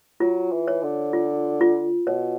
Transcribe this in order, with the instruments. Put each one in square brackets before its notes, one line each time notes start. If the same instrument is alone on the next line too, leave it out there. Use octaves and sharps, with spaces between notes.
[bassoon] F#3 [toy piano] F4
[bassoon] E3
[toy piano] C#5
[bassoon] D3
[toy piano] F4
F4
[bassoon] B2 [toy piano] C#5